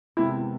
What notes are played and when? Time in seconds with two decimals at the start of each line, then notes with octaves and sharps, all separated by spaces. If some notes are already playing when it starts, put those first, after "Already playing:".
0.17 E2 C3 D#3 G#3 C4 E4